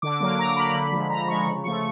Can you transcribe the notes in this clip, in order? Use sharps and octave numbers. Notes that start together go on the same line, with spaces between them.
D3 D6
F#3 A#3
D3 A#5
F#3 A#3 B5
D3
F3 G#3
D3 A#5
F3 G#3 C#6
C#3
F3 A3 C#6